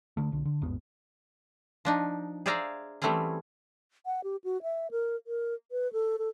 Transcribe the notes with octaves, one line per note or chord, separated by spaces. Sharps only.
D3 A3
B1 D3
D3
A1 E2 G#2 B3
F3 D4 D#4
G#4 C5 D5 E5 F5 A#5
E3 G3 A3 C4 C#4 G#4
F#5
G4
F#4
E5
A#4
A#4
B4
A4
A4